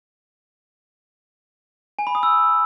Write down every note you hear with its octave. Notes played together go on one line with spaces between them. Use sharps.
G#5
B5
D#6
E6